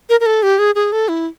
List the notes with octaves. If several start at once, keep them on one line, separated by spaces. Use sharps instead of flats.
A#4
A#4
A4
G4
G#4
G#4
A4
E4